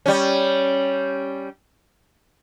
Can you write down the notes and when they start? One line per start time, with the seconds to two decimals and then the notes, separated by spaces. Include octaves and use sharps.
0.06 G3 C#4